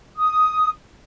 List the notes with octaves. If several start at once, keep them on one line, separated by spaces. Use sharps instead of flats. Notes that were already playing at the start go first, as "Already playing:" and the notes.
D#6